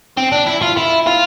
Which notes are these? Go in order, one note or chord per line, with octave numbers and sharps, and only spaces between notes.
C4
D4
E4
F4
E4
F4